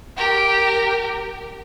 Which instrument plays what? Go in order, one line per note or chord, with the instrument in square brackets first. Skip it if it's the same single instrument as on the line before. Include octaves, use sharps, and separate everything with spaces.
[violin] G4 A#4